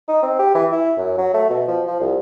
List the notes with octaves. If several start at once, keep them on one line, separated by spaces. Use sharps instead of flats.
D#4
C4
G4
E3
E4
F#2
F#3
A3
B2
F3
F3
C2